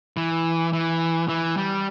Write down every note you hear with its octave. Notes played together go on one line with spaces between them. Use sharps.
E3
E3
E3
G3